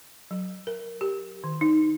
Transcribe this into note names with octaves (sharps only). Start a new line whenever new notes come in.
F#3
A#4
G4
D#3
D#4